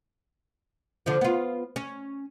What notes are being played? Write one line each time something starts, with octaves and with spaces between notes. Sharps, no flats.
D3 F3
B3 F4
C#4